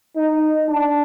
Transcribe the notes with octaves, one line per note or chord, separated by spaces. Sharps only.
D#4
D4